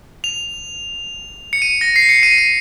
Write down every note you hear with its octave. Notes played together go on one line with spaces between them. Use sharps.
F7
C#7
D#7
A#6
C7
C#7
D#7
D#7